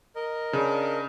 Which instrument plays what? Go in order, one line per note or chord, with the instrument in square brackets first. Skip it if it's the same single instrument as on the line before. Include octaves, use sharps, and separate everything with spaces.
[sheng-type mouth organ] A#4 D#5
[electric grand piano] C#3 [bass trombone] D4